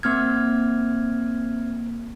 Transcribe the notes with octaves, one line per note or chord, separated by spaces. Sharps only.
A#3 C4 F6 G#6